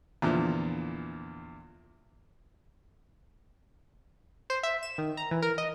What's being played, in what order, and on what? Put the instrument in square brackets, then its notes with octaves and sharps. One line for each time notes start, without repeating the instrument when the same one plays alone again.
[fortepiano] E2 A#2 D3 F3
[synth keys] C5
E5
E7
D#3
A#5
E3
A#4
D#5